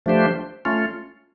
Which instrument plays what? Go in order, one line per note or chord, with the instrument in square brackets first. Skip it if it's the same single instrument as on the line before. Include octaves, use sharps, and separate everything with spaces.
[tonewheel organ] F3 A3 D4 G4 C5
A3 C#4 F4